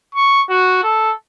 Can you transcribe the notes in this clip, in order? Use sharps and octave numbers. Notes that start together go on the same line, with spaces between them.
C#6
F#4
A4